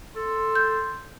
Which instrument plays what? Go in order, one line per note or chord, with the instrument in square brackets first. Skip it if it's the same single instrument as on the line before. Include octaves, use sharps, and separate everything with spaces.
[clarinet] A4 [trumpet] C6
[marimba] G6